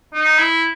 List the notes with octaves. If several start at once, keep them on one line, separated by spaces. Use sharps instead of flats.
D#4
E4